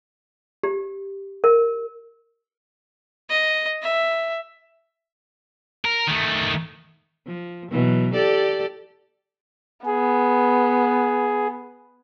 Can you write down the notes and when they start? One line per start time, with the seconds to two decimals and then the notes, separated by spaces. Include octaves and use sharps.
0.63 G4
1.44 A#4
3.29 D#5
3.82 E5
5.85 A#4
6.07 D#3 A3
7.26 F3
7.71 B2 E3 F#3
8.14 G4 A4 D5
9.86 B3 G#4